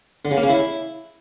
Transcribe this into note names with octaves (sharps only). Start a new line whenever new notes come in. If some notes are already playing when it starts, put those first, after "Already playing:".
D3
C#3
A#3
C#3
E4